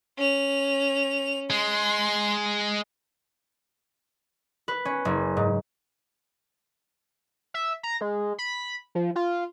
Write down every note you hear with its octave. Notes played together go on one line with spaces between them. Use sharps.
C#4 F7
G#3 C6
B4
C#4
F#1
G#2
E5
A#5
G#3
B5
F3
F4